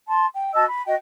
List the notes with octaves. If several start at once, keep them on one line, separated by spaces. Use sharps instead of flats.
A5 C6
G5
F#4 D#5 A5 E6
B5
F#4 D#5 G5